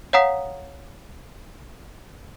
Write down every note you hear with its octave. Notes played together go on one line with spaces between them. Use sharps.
C#5 F5 F#5 A#5 D#6 B6